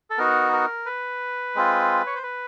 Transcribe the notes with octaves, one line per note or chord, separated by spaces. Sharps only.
A4
B3 D#4 F#4 A#4
A#4
B4
G#3 C4 F4
C#5
C5
B4